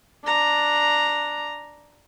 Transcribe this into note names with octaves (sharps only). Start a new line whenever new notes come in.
D4 A#5